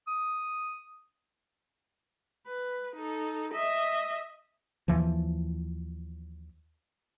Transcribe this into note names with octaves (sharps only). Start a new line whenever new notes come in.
D#6
B4
D#4 A4
D#5 E5
D#2 E3 F3